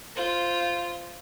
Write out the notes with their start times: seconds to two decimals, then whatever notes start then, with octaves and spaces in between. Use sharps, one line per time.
0.15 F4 C5